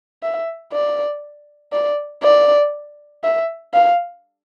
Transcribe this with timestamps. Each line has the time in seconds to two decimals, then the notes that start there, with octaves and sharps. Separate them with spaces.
0.23 E5
0.72 D5
1.73 D5
2.23 D5
3.24 E5
3.74 F5